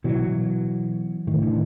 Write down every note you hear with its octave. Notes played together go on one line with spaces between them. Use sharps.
B2 E3 F#3
A2 D#3
D3 E3